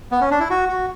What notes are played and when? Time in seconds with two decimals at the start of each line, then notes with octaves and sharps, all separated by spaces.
0.11 B3
0.21 C#4
0.31 D4
0.40 E4
0.50 F#4
0.69 F#4